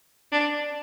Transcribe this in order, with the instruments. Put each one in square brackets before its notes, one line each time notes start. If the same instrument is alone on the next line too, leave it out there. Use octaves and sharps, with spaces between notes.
[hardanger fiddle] D4